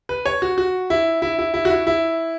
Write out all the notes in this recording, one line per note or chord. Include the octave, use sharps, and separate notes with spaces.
B4
C#5
F#4
F#4
E4
E4
E4
E4
F#4
E4
E4